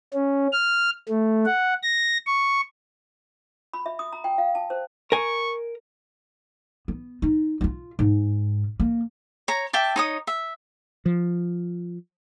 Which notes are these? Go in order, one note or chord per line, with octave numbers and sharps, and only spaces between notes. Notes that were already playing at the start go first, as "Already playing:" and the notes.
C#4
F6
A3
F#5
A#6
C#6
B5
E5
D#6
A#5
G5
F5
A5
C5
A#4 G#5 C#6
B3
D#4
D#4 F4
G#2
A#3
C#5 A#5
E5 G5 A5 D6
D#4 C#5 D#6
E5
F3